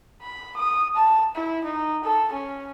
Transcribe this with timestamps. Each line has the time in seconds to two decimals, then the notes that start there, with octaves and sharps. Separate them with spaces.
0.21 B5
0.56 D#6
0.95 A5
1.35 E4
1.64 D#4
2.04 A4
2.32 C#4